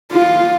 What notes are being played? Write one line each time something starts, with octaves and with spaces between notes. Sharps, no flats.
F4